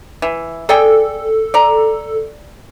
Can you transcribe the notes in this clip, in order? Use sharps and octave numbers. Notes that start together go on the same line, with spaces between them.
E3
G#4 A4 D5 G5
D5 A#5